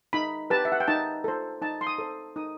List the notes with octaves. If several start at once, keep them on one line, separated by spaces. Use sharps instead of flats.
D#4 B5
G4 B4 A5
E5
F#5
G5
D#4 A5
A4 C5
D#4 A5
C6
D#6
A4 C5
D#4 D#6